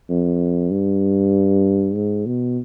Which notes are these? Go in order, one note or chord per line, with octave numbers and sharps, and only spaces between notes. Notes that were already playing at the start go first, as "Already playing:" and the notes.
F2
G2
G#2
B2